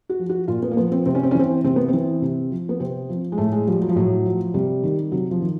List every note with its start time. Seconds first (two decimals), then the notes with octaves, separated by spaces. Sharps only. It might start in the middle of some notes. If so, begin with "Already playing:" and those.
0.09 F#4
0.19 F3
0.29 F#4
0.48 A#2 F4
0.63 B3
0.71 A#3
0.77 F3 B3
0.92 C4
1.06 C3 C4
1.15 C#4
1.23 C4
1.31 C#4
1.35 E3 C4
1.64 C3 C4
1.76 B3
1.88 C4
1.93 E3
2.22 C3
2.51 F3
2.69 B3
2.80 C3 C4
3.09 F3
3.32 G#3
3.38 A2 A3
3.52 G#3
3.67 F3 G3
3.82 F#3
3.89 F3
3.96 A2 F#3
4.26 F3
4.54 C3 G3
4.83 D#3
5.12 C3 F#3
5.31 F3
5.41 D#3